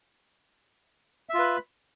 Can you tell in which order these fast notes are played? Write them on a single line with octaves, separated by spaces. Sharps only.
E5 F4 B4 B5